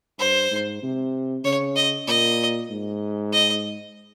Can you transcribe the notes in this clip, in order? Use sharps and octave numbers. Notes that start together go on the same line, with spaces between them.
G2 C5
G#2
C3
C#3 C#5
D#5
A#2 D#5
G#2
D#5